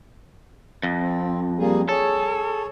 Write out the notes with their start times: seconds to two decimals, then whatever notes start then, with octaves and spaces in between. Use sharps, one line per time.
0.83 F2
1.00 C4
1.59 G3 A#3 G#4
1.89 G#4 A4 C#5